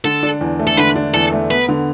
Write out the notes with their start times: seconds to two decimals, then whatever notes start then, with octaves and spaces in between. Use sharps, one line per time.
0.04 D3 A4
0.23 D4
0.41 E2
0.59 A3
0.67 A4
0.77 D3 B4
0.96 D4
1.14 E2 A4
1.32 A3
1.50 B3 B4
1.69 D3